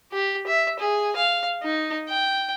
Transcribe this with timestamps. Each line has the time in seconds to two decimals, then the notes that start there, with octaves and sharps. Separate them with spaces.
0.13 G4
0.47 E5
0.79 G#4
1.16 F5
1.63 D#4
2.08 G5